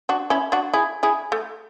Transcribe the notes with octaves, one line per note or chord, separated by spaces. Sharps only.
D4 F#4
C#4 E4
D4 F#4
E4 G#4
E4 G#4
A3